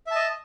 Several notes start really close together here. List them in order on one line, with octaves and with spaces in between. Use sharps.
E5 A5 D#5